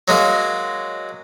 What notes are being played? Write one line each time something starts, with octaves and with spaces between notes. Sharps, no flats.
F#3 G#3 A#3